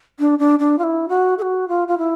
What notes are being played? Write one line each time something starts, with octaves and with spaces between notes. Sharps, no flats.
D4
D4
D4
F4
E4
F#4
A4
F#4
F4
F4
E4